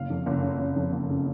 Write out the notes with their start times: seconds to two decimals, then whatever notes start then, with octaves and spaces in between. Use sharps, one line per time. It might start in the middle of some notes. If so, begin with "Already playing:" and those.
Already playing: F#1 F5
0.10 F2
0.26 F#1
0.43 C#3
0.59 F#1
0.76 F2
0.92 F#1
1.09 C#3